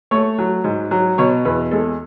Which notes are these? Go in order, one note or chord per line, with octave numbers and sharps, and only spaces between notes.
A3 C#5
F#3
G#2
F#3
B2 C#5
E2 B4
G#3 A4